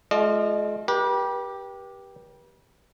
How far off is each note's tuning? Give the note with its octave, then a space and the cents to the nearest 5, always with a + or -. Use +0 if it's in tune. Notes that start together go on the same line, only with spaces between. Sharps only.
G#3 +45 F4 +0 D#5 -40
G4 +0 B4 -40